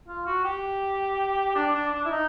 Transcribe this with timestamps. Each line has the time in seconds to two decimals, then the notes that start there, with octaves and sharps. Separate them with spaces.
0.08 F4
0.26 F#4
0.44 G4
1.55 D4
1.73 D4
1.92 D4
2.05 E4
2.10 D#4